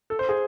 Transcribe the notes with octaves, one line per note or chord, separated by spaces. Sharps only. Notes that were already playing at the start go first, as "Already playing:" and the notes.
A4
C5
G#4